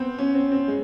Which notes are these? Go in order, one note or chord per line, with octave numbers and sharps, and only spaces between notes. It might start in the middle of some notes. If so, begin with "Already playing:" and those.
Already playing: B3 C4
C#4
C4
C4
G#3